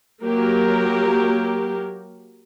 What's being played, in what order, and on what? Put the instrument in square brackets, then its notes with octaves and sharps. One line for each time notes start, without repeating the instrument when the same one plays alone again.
[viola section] F#3 A#3 G4 A#4